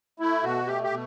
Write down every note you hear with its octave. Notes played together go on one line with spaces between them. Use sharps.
A3 E4
B2 F#4
A3 G4
G4
B2